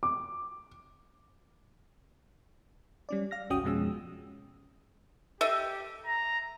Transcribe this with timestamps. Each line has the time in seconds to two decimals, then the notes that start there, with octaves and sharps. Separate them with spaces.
0.03 D6
3.09 G3 C#4 D5
3.31 F5 F6 A#6
3.50 G1 C#2 C#4 F#4 G5 D#6
3.64 F2 B2 F3 G#3 C#4 E6
5.41 G4 A4 D#5 E5
6.06 A#5